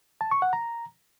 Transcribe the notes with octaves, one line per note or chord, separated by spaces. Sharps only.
A5
C#6
F#5
A#5